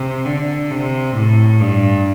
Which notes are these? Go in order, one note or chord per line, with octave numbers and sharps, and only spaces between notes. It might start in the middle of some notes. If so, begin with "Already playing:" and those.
Already playing: C3
D3
C3
A2
G2